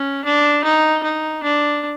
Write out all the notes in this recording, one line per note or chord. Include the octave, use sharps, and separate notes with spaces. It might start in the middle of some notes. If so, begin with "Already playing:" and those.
Already playing: C#4
D4
D#4
D#4
D4